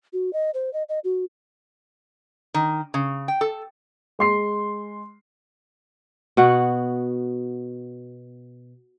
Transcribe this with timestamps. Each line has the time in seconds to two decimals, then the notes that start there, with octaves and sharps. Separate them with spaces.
0.13 F#4
0.33 D#5
0.54 C5
0.73 D#5
0.89 D#5
1.04 F#4
2.54 D#3
2.94 C#3
3.28 G5
3.41 A4
4.19 G#3 C6 C7
6.37 B2 B3 F#4 F#5